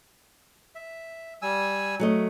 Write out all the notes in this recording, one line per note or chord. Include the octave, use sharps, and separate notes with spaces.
E5
G3 G#5 E6
F#3 A3 D#5